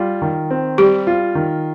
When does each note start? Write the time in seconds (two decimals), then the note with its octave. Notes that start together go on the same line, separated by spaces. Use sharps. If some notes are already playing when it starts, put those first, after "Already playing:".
Already playing: G3 F4
0.22 D#3
0.51 C4
0.78 G3 G4
1.07 F4
1.35 D#3